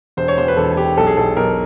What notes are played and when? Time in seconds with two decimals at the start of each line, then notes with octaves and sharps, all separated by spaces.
0.17 E1 C5
0.28 C#5
0.38 E1 C5
0.48 B4
0.57 E1 A4
0.77 E1 G4
0.97 B1 A4
1.07 G#4
1.17 B1 A4
1.36 B1 A#4